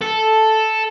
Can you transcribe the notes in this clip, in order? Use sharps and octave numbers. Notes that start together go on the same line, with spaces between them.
A4